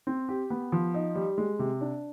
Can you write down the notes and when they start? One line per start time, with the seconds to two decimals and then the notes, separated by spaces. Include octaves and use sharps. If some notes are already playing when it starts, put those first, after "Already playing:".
0.07 C4
0.29 G4
0.50 B3
0.72 F3
0.94 D#4
1.15 G3
1.38 G#3
1.59 C3
1.81 D4